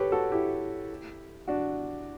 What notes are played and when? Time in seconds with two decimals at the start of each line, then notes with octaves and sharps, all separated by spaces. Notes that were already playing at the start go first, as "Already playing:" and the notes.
Already playing: G4 A4 B4 C#5
0.12 F#4 A4
0.32 E4 G4
1.48 D4 F#4